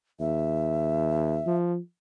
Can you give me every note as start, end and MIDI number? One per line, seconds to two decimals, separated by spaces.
0.20 1.41 39
0.20 1.56 76
1.46 1.78 53